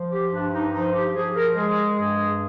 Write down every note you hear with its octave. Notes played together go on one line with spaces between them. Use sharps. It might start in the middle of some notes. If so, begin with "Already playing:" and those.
Already playing: F3
G4
G2 D4
D#4
F3 D#4
G4
F3 G#4
G#4
A#4
G#3 G#4
G2 G#4